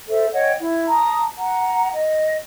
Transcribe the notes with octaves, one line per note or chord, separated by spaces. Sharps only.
A4 C5 E5
C#5 D#5 F#5 G5
E4
A5 A#5 D#6
F#5 A#5
D#5